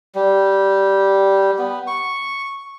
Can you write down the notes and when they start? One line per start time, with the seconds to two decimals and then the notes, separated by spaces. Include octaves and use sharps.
0.15 G3
1.59 B3
1.87 C#6